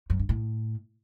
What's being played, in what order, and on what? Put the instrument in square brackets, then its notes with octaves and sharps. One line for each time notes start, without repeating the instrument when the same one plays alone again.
[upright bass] F#2
G2
A2